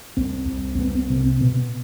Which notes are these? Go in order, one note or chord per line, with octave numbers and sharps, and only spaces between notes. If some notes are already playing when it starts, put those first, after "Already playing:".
C2 C4
C2
C4
C2 B3
C4
C3 C4
C4
B2 B3